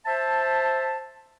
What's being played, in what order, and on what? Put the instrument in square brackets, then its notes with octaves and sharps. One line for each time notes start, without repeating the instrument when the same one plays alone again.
[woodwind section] C5 E5 A5